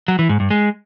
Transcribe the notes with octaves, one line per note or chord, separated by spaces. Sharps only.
F#3
E3
G#2
G2
G#3